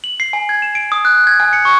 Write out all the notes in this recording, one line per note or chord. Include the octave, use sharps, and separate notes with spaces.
F#7
C7
G#5
G#6
E7
D7
D#6
F#6
G#6
G#5
C#7
C#6